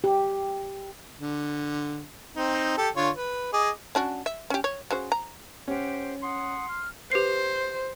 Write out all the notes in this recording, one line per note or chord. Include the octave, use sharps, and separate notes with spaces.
G4
D3
C4 D#4
G4 A4
D3 F4 C#5
B4
G#4 D#5 D6
C#4 D4 F#4
E5
C#4 G4
C#5
C#3 F#4 C5
A#5
C#4 G4 C5 F#5
F#5 C6 D#6
F6
G4 B4 C5 C7